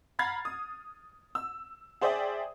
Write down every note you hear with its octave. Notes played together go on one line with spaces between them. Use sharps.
A#5 B5 F6 G#6 A6 C7
D#6
E6
G#4 C5 D5 E5 G5 D#6